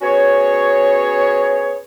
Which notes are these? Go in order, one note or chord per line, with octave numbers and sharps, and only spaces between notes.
B3 C#4 F#4 G#4 C#5